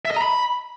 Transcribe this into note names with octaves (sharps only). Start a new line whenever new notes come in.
E5
D#5
A#5
B5